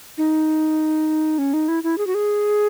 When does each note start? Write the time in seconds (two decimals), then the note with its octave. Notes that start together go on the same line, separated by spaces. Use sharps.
0.18 D#4
1.38 C#4
1.54 D#4
1.68 E4
1.83 E4
1.98 G#4
2.07 F#4
2.15 G#4